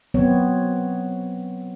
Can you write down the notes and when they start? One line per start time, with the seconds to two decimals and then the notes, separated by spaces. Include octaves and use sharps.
0.14 F#3 B3 C4 C#5